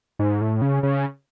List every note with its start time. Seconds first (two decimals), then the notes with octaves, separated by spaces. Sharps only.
0.19 G#2
0.41 A2
0.62 C#3
0.83 C#3